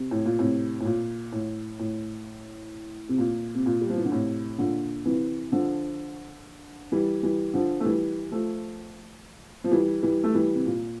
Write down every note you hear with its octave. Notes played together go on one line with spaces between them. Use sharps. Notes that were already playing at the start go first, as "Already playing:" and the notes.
Already playing: C3
A2
A#2
A2 C3
A2
A#2
A2
A2
C3
A#2
C3
A#2
G3
F3
E3
D3
A2 C3
A#2 D3
C3 E3
D3 F3
E3 G3
E3 G3
D3 F3
A3
E3 G3
F3 A3
F3
E3 G3
E3 G3
A3
E3 G3
C3
A#2